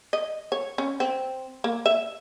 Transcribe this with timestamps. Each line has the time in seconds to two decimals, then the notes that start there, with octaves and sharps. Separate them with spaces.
0.13 D#5
0.52 C#5
0.78 C#4
1.00 C4
1.64 A#3
1.86 E5